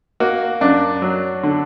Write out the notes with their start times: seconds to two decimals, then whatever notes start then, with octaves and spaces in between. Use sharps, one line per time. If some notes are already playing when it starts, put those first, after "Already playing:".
0.20 A#3 F#4
0.61 F#2 D4
1.02 F#3
1.43 D3